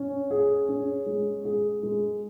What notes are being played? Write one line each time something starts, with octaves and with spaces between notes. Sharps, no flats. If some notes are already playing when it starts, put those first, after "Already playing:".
Already playing: C#4
G#4
C#4
G#3
G#4
G#3